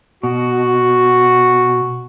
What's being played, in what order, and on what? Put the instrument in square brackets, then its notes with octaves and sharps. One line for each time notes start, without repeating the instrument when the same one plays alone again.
[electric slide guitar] B2 [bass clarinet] F#4